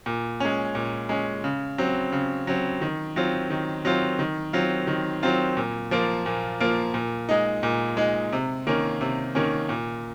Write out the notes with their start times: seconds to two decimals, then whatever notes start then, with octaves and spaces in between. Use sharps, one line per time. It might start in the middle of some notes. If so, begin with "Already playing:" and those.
0.06 A#2
0.40 G#3 C#4
0.75 A#2
1.09 G#3 C#4
1.44 C#3
1.78 F#3 C4
2.12 C#3
2.47 F#3 C4
2.82 D#3
3.16 F#3 C4 F4
3.50 D#3
3.85 F#3 C4 F4
4.19 D#3
4.53 F#3 C4 F4
4.87 D#3
5.23 F#3 C4 F4
5.57 A#2
5.91 F3 A#3 F4
6.26 A#2
6.60 F3 A#3 F4
6.94 A#2
7.29 G#3 D#4
7.63 A#2
7.97 G#3 D#4
8.32 C3
8.67 D#3 A#3 C#4
9.01 C3
9.35 D#3 A#3 C#4
9.69 A#2